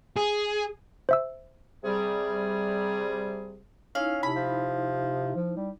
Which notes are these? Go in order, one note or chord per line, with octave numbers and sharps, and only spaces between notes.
G#4
C5 E5 E6
C3 G3 G#4
C#4 D#4 E4 F5
C3 B5
F3
F3
G3